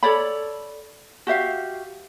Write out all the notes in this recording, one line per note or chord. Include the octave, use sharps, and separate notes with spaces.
A4 C#5 D5 B5
F#4 G4 E5 F5